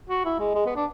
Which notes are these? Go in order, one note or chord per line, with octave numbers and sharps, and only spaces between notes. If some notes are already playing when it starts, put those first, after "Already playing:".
F#4
E4
G#3
G#3
B3
D4